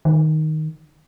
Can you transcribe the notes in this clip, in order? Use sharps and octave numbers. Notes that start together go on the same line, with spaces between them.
D#3